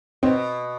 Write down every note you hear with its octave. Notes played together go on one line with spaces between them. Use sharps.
B2 C4